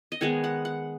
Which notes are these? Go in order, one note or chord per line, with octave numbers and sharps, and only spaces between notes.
D#5
D#3 G#3 B3 C#5
F#5
F#5